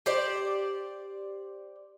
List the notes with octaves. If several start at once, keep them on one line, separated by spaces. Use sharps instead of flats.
G4 C5 D5